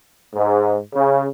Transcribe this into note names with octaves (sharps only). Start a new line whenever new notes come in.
G#2
C#3